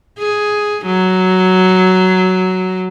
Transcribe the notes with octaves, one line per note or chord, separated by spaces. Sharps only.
G#4
F#3